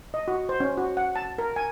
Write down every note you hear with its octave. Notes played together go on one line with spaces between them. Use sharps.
D#5
F#4
C5
C#4
F#4
F#5
A5
A#4
G#5